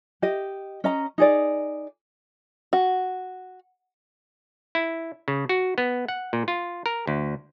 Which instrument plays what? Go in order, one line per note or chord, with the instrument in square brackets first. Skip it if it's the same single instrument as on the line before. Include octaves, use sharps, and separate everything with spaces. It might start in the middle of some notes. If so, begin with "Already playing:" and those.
[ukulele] G4 D#5
C#4 D#5 A#5
D#4 G#4 D5
[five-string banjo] F#4
[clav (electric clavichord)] E4
C#3
F#4
B3
F#5
A#2
F4
A#4
D2